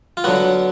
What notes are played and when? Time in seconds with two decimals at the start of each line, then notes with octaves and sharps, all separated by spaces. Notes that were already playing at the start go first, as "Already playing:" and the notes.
0.17 F4
0.24 D3 F#3 B3 F#4